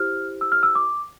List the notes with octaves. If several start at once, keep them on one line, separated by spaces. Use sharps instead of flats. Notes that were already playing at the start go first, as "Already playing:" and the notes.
Already playing: E4 G4 C5 F6
E6
F6
E6
D6